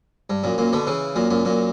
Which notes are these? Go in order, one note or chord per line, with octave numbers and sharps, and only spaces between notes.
G2
F#2 A#2
F#2 A#2
B2 D3
C#3 E3
F#2 A#2
F#2 A#2
F#2 A#2